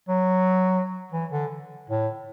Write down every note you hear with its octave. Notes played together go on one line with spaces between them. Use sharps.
F#3
E3
D3
A2